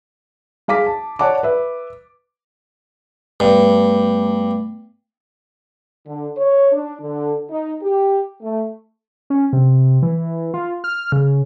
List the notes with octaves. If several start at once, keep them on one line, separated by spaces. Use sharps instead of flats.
G#3 F5 D6 B6
A5
C#5 D5 F#5 A5 D6
B4 E5
G2 A3 B3 D6
D3
C#5
D4
D3
D#4
G4
A3
C#4
C3
E3
F4
F6
C#3